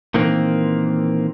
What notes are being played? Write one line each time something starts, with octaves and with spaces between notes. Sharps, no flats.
A#2 D#3 E3 A#3 C4